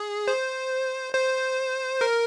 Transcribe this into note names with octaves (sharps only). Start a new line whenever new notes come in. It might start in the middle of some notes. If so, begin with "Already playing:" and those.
Already playing: G#4
C5
C5
A#4